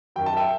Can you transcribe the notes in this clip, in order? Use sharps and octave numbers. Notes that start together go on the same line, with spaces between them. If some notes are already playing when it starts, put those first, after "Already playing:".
F#2 D#3 F#3 G5
A5
E5 G5